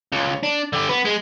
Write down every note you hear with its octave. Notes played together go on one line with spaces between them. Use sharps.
C#2
D4
D3 G4
B3
G#3